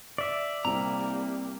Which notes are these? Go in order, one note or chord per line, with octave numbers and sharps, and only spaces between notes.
D5 E5
C2 G3 A#3 C4 A#5